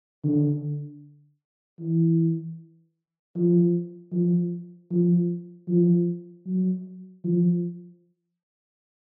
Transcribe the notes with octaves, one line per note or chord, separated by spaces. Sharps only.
D3
E3
F3
F3
F3
F3
F#3
F3